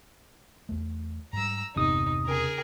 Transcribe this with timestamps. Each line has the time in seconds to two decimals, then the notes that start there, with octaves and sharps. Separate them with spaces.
0.69 E2 A3
1.33 G#2 G3 A#5 E6
1.76 G1 E2 C3 D#4 D#6
2.26 C#3 G#4 A#4